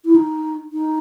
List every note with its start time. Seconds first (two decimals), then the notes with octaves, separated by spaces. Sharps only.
0.05 E4
0.16 D#4
0.73 D#4